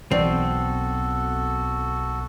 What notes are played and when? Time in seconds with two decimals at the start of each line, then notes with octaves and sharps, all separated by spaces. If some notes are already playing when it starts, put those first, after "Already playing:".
0.11 B1 B2 E3 C4 F#4 A4 D5